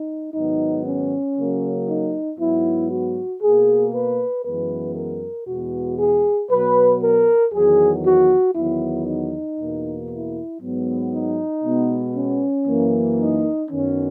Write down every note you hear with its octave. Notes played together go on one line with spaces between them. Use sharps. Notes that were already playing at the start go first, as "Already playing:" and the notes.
Already playing: D#4
G#2 D#3 F#3 B3 D#4
C#4
C#3 F#3 A#3
D#4
G#2 F#3 B3 E4
F#4
B2 A#3 G#4
B4
F#2 E3 G#3 B3 B4
A#4
E2 B2 G#3 B3 F#4
G#4
B2 F#3 B3 B4
A#4
E2 D#3 F#3 B3 G#4
F#4
E2 D#3 F#3 B3 E4
D#4
E2 B2 A#3
E4
G#2 F#3 B3
D#4
B2 G#3 B3
C#4
F#2 E3 A#3
D#4
F#2 D#3 F#3 B3 C#4